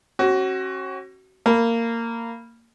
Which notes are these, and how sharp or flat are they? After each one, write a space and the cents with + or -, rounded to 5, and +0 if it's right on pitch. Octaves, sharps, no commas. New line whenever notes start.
C#4 -40 F#4 +25
A#3 -15 B5 -15